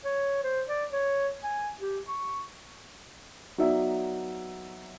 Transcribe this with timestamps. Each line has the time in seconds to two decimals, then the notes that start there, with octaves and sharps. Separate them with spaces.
0.05 C#5
0.43 C5
0.68 D5
0.92 C#5
1.44 G#5
1.80 G4
2.08 C#6
3.58 F#3 B3 D#4 D5 E5